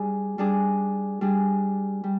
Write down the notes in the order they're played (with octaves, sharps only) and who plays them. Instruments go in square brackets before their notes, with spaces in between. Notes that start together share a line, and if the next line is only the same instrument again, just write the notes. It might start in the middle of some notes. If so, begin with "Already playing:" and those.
Already playing: [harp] G3 D4 G#4
G3 D4 G#4
G3 D4 G#4
G3